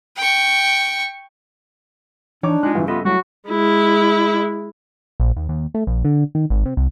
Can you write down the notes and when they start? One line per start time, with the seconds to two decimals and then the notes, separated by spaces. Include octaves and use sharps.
0.17 G5 C#6
2.43 E3 D4 D#4 C#5 D6
2.63 G#3 D#4 F4 F#6
2.75 G2 C#3 E3
2.88 B3 F4 A4 D#5 E5
3.05 F#3 G3 A3 E4 F#4
3.49 G#3 E4
5.20 A#1
5.36 D#2
5.49 D#2
5.74 A3
5.87 A#1
6.05 D3
6.35 D#3
6.50 G#1
6.65 C3
6.77 C2